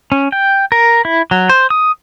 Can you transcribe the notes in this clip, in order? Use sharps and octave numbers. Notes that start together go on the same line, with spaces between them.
C#4
G5
A#4
E4
F#3
C5
D#6